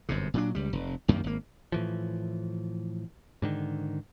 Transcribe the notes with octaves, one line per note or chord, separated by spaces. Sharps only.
G1 F#2 C3
A#2 F#3 D4
C#2 G3
F1
C2 F#2 D#3 A#3
G#1 A#3
A2 E3 F3
G#2 D3 D#3